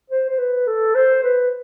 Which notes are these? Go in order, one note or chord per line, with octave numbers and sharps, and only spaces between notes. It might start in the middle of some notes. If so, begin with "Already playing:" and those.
C5
C5
B4
A4
C5
B4